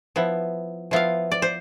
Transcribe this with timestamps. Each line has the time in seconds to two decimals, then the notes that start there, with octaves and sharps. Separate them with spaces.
0.16 F3 B3 E4
0.91 F3 B3 E4 F4 F5
1.32 D5
1.42 C5